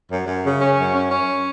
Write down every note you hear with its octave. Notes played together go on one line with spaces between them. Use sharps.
F#2
F#2
C#3
C#4
F#2
C#4
C#4